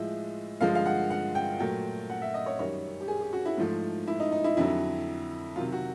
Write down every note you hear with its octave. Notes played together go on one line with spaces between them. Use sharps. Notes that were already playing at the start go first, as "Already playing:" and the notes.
Already playing: A2 F3 G#3 E5
G2 D3 F3 G#3 F5
F5
F#5
F#5
G5
A#2 F#3 A3 G5
F#5
E5
D#5
C#5
F#2 D#3 G3 C#5
G4
G#4
G4
F#4
E4
G#2 F3 A3
E4
D#4
D#4
E4
F2 D3 F#3 E4
C3 D#3 F#3 F4
F#4